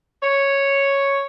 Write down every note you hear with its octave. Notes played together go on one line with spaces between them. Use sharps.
C#5